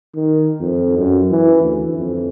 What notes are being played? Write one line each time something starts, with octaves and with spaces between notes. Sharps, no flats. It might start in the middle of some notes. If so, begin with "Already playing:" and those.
D#3
F2
F#2
E3
D2
F2